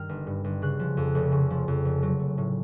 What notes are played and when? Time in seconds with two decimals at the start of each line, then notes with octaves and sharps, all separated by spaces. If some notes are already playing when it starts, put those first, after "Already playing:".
Already playing: G2 D#3 F6
0.09 G1
0.27 G2
0.44 G1
0.62 C#3 F#6
0.79 F3
0.97 F2
1.15 F1
1.32 C#3
1.50 F3
1.68 F2
1.85 F1
2.02 F#3
2.19 A3
2.38 A2